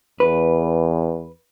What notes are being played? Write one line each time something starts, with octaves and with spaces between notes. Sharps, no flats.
E2 B4